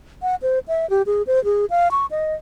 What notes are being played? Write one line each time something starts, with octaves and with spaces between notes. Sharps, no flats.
F#5
C5
E5
G4
G#4
C5
G#4
F5
C#6
D#5